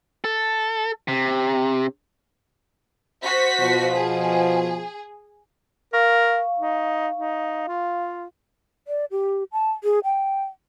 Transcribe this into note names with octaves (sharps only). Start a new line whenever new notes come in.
A4
C3
F#4 C5 B6
B2 F3
G#4
A#4 F5 C#6
D#4
D#4
F4
D5
G4
A5
G#4
G5